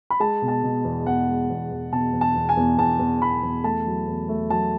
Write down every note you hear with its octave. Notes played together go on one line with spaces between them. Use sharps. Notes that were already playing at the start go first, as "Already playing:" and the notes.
B5
G#3 A5
B2
A5
B2
E2
E2 F#5
G#3
E2
E2
B2 A5
E2
A5
E2
G#5
E2
E2 A5
E2
E2 B5
E2
A3 A5
F#3
E2
A3
F#3 A5